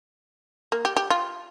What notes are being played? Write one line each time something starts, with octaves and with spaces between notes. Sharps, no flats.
A#3
G4
G4
F4